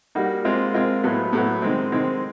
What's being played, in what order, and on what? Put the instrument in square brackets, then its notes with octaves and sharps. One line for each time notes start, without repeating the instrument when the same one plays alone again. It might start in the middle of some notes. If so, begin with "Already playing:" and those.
[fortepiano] G3 A#3 D#4 F#4
G#3 C4 F4 A#4
G#3 C4 F4 A#4
A2 F#3 B3
A2 F#3 B3
D#3 G#3 C4
D#3 G#3 C4